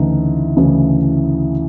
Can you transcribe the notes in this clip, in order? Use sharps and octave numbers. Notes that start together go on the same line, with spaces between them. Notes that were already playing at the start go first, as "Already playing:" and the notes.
Already playing: D2 C#3 E3 D#4
D2 C#3 E3